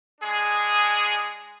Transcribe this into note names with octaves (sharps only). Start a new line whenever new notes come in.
G#3 D4 G#4